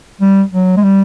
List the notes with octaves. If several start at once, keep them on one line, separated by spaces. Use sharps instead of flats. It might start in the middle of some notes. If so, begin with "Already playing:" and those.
G3
F#3
G#3
G3